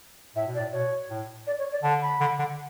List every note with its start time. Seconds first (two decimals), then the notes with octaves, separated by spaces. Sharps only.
0.36 A2 E5
0.47 B2
0.55 D5
0.59 A2
0.72 B2 C#5
1.10 A2
1.47 D5
1.59 C#5
1.72 D5
1.83 D3 A5
2.02 B5
2.20 D3
2.39 D3